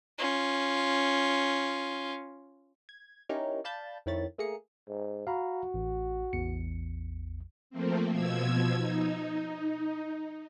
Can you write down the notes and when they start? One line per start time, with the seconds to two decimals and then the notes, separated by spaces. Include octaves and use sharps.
0.18 C#4 F4
2.89 G#6
3.29 C#4 D#4 E4 G4 A#4 C#5
3.64 D5 F5 A5 B5 G6 A6
4.06 F2 D#3 E4 C#5 B5 A6
4.38 A3 A#3 G#4 A#5 D#6 C#7
4.89 G#2
5.27 F#4 F5 A#5 B5
5.74 A1
6.33 A1 E2 C#7
7.70 F3 A3 A#3 C4
8.11 B2 F3 E6 G#6
8.76 D#4